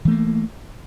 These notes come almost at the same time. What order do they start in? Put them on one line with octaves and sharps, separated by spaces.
E3 A3 A#3